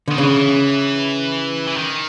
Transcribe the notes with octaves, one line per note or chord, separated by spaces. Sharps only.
D3 D#3
C#3 E3
E3
D#3